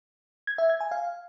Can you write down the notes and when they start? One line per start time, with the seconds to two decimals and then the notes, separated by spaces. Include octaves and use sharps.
0.47 G#6
0.58 E5
0.69 G#6
0.80 G#5
0.91 F5